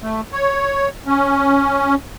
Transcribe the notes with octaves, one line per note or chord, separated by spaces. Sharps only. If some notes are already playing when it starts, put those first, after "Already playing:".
A3
C#5
C#4